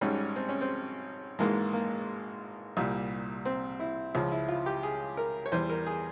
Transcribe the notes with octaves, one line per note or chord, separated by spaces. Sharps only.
G#1 G#2 G3 C#4
C4
C#4
C4
G#1 G#2 E3 G#3 A#3
A#3
C2 A#2 G3
C4
E4
C#2 C#3 F3
E4
F4
G4
G#4
A#4
C#5
E2 E3 G3 C5
A#4
G#4